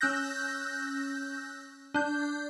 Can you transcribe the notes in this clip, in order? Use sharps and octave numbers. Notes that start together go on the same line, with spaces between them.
C#4 E6 F#6 G6 A#6
D4 G6